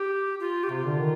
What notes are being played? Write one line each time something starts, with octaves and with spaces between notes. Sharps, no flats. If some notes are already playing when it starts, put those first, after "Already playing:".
Already playing: G4
F4
G4
C3 F4
D3
D#3